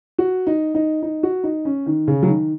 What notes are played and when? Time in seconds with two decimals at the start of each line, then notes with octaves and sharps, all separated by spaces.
0.18 F#4
0.47 D#4
0.75 D#4
1.02 D#4
1.23 F#4
1.44 D#4
1.65 C#4
1.86 D#3
2.08 C#3
2.23 F#3
2.27 D#3